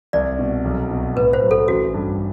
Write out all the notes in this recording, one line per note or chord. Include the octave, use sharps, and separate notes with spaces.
C2 D5
B2
B1
B2
A2 B4
C5
F#3
A4
A1 F#4
G2